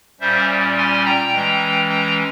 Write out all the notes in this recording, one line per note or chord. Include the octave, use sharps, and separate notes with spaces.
A#2 G3 C#4 C5 E5
G#5 C6
G5 A#5
E3 G#3 C#4
G5 A#5